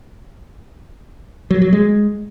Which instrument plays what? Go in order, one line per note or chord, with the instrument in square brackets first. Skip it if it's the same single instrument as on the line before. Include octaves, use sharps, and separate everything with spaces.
[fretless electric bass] F#3
F#3
G#3